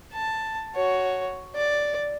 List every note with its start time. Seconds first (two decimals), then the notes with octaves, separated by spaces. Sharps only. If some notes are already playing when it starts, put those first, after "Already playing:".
0.13 A5
0.75 F#4 C#5
1.55 D5